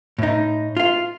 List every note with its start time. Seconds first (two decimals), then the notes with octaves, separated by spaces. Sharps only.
0.19 A2 D#4
0.77 F4 F5